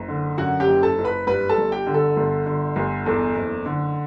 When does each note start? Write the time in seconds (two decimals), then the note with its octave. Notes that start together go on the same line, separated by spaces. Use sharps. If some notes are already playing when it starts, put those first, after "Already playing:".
Already playing: F#1
0.08 D3
0.38 F#2 F#4 F#5
0.60 G4 G5
0.67 F#1
0.83 A4 A5
0.98 F#1
1.05 B4 B5
1.27 G2 B4 B5
1.49 A4 A5
1.58 G1
1.72 G4 G5
1.87 D3
1.94 A4
2.17 G1
2.46 D3
2.76 G1
3.06 E2 A4
3.36 F#1
3.66 D3